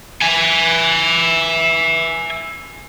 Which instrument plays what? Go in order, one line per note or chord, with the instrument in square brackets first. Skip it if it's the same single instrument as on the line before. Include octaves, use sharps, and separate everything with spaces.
[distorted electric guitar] E5 G#5